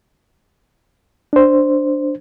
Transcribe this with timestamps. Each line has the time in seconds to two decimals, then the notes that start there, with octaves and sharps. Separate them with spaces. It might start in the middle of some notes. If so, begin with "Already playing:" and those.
1.33 D4 C5